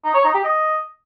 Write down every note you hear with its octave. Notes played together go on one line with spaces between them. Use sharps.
D#4
C#5
D#4
G4
D#5